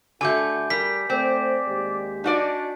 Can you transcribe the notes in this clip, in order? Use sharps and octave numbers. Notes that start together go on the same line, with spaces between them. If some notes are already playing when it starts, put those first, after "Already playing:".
D3 A3 F#4 G#5 D6 G6
G3 A#4 B6
A3 C4 C5 D5
D#2 G#3 G4
D4 D#4 F#4 D5